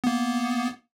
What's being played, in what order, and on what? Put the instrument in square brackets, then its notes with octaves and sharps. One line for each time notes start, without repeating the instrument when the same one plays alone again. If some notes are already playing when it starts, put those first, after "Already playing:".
[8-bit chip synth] A#3 B3